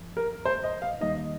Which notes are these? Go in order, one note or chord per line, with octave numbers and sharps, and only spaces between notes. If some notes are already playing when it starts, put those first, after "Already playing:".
Already playing: G2 F3
A#4
C5
D#5
F5
D#2 D#3 G3 A#3 D#4 D#5